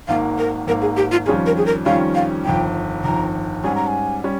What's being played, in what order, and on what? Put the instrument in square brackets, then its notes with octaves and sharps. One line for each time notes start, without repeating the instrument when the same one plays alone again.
[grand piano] G#1 G#2 D#3 A#3 [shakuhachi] F5
[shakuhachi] A#4
[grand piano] G#1 G#2 D#3 A#3 [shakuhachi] A#4
[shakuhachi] G#4
G4
F4
[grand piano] F2 D#3 G3 C#4 F4 [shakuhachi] G#4
[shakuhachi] A#4
G#4
A#4
[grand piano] F2 D#3 G3 C#4 F4 [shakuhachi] F5
[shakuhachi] F5
[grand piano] G1 F2 D#3 [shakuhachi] G5
[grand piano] G1 F2 D#3 [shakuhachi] A#5
[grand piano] G#2 G3 C#4 [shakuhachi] G#5
[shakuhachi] A#5
G#5
[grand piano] G3 C#4